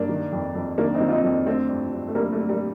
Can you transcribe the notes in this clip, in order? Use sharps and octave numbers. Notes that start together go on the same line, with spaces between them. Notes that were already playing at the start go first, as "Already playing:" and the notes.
Already playing: G2 A#3 D4
D#3
F2
F2
D#3 A#3 D4
C4 D#4
D#3
F4
C4 D#4
F2
D3 A3 C4
G2
G2
A3
D3 G3 A#3
A3
D3
G3 A#3